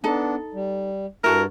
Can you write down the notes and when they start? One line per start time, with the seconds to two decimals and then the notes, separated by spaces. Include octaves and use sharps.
0.04 B3 D4 D#4 A4
0.54 G3
1.24 G2 E4 F#4 A4 A#4